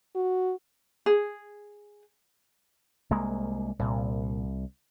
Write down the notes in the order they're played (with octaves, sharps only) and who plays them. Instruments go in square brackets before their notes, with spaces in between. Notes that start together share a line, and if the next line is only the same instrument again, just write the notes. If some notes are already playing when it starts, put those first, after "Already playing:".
[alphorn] F#4
[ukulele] G#4
[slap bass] C2 G#3 A#3
[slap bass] C2 [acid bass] A#2